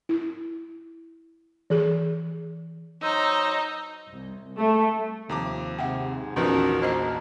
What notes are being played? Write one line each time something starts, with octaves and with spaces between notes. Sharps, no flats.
E4
E3 G#4
F#3 D#4 C5 E6
C2
A3
D#2 C3 F3 A#5 D6
G#2 C3 E5 F#5 G5
A#1 E2 D#3 F3 C#4 F#4 B4
A#3 C5 D#5 A#5